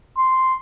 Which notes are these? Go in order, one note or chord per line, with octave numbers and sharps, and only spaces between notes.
C6